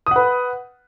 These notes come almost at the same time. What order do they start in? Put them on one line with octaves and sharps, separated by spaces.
D#6 F#5 B4